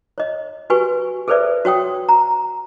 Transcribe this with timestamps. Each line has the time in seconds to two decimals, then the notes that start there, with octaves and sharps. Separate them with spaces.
0.18 C#5 D#5
0.70 F#4 G4 B4 G#5 C#6
1.28 G#4 A4 B4 C5 D5 E5
1.65 F#4 C#5 G5 D#6
2.09 A#5